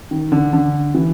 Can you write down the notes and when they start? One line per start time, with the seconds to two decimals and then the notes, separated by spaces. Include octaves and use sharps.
0.11 D#3
0.32 D3
0.53 D3
0.95 E3